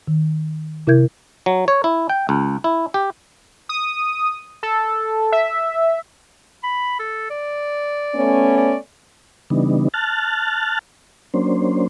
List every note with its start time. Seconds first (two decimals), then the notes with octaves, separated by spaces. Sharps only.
0.08 D#3
0.87 C3 E4 A#4 E5 G6 G#6
1.46 F#3
1.68 C#5
1.84 E4
2.09 G5
2.29 C#2
2.64 E4
2.94 G4
3.69 D#6
4.63 A4
5.32 E5
6.64 B5
7.00 A4
7.30 D5
8.15 A3 B3 C#4
8.58 D5
9.50 C#3 E3 G3 B3 D4 D#4
9.94 A5 F6 F#6 A6
11.34 F#3 A#3 C#4 D4 C5